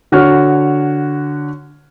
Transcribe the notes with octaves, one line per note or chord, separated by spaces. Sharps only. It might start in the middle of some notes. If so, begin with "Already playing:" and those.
D3 F#4 C#5 F6